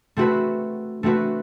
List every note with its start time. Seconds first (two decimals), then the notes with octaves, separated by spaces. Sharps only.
0.17 A3 C4 F#4 B4
1.03 A3 C4 F#4 B4